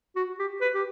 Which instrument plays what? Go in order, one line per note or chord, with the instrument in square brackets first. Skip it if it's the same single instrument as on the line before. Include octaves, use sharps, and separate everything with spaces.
[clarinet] F#4
G4
B4
G4